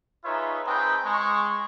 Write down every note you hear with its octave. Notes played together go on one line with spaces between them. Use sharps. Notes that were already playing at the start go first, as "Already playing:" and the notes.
D#4 F4 G#4 B4 C#5 E5
C4 D#4 G#4 B4 G5 A5
G#3 C#6